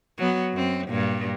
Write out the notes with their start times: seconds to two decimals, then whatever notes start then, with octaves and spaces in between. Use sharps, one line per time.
0.18 F#3 B3
0.53 F#2 C4
0.87 G2 A#2